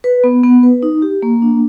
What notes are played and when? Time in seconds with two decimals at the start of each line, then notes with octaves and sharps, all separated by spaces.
0.04 B4
0.24 B3
0.43 B3
0.63 B4
0.83 D#4
1.02 G4
1.22 A#3
1.42 D4